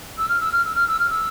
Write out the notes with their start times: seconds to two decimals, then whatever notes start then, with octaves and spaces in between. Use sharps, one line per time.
0.18 E6
0.29 F6
0.40 E6
0.52 F6
0.64 E6
0.75 F6
0.88 E6
0.99 F6
1.10 E6